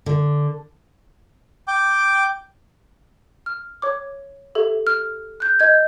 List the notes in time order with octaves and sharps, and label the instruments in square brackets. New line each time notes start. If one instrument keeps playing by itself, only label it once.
[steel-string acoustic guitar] D3
[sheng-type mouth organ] G5 D6
[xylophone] F6
C#5 D6
G4 A4 E5
F6
F#6 G6
D#5 G6 G#6